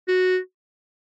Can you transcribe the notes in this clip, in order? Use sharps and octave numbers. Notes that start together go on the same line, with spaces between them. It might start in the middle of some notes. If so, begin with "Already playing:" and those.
F#4